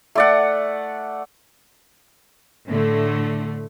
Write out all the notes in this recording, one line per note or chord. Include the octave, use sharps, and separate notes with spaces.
A3 D5 F#5
A2 D3 A3